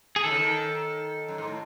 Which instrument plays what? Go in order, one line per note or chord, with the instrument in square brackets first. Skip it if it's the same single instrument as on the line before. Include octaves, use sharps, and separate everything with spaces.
[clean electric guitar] G#4
[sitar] D#3 [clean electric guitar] A4
[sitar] C#3
D#3
F#2
G#2
A2